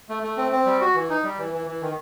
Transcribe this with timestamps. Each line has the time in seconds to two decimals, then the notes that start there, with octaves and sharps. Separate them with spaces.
0.09 A3
0.23 A3
0.37 C4
0.52 C4
0.66 G3
0.81 F#4
0.95 E3
1.09 D#4
1.24 G3
1.39 E3
1.53 E3
1.67 E3
1.81 D#3